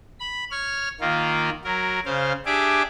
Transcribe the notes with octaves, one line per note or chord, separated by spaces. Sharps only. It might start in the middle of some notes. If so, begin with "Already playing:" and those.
B5
C#5 F6
D#3 A#3 F4
F#3 A#4
C#3 C5 F5
D4 G4 G#4 E5 D6